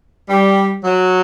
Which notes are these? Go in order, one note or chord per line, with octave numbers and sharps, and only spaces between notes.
G3
F#3